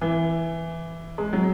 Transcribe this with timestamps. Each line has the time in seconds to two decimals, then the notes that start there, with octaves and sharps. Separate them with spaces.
0.01 E3
1.18 G#3
1.33 F#3